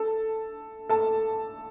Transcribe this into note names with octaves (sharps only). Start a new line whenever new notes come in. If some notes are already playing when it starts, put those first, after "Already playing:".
Already playing: A4 A5
A4 A5